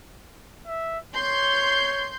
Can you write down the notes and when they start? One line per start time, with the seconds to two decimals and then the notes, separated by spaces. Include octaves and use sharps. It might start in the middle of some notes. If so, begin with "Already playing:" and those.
0.67 E5
1.15 C#5 C6 G6